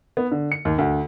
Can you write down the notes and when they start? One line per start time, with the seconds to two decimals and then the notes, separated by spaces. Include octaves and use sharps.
0.17 B3
0.31 D3
0.52 C#7
0.65 D#2
0.78 D2